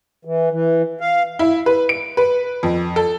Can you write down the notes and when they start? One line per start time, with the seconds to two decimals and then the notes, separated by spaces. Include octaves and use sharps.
0.25 E3
0.51 E3
1.01 F5
1.39 E4
1.66 B4
1.89 D7
2.17 B4
2.63 F2
2.96 A4